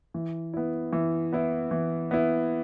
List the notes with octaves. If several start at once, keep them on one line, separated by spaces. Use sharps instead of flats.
E3
B3 E4
E3
B3 E4
E3
B3 E4